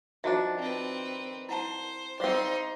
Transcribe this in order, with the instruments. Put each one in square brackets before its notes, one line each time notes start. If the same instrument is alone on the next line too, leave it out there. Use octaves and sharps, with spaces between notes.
[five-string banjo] D#3 F3 D4 [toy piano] F#4 E5
[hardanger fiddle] C4 B4
[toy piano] E4 F#5 A5 [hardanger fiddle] C5
[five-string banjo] G3 C4 [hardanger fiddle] D#4 C6 [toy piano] C5 F5